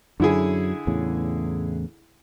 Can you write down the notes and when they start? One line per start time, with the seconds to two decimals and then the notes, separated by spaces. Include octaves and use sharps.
0.20 F#2 D3 F#3 E4 G#4
0.87 E2 A2 C#3